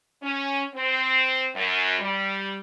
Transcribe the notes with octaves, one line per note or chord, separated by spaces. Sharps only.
C#4
C4
F#2
G3